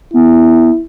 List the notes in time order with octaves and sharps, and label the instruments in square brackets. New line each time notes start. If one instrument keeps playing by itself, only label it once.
[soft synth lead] B3 [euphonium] E4